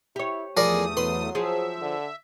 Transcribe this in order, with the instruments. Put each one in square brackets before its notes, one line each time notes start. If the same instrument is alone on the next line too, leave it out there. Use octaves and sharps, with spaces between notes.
[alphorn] E4 [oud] G4 C#5
[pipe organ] E2 A3 D#6 [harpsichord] F3 A#4 D5 [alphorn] G#4
[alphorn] F#3 [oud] B4 [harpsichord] C6
[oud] F3 G#4 [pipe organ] E5
[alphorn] D3